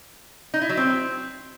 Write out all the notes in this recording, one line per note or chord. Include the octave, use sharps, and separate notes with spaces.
D#4
E4
F#3
C4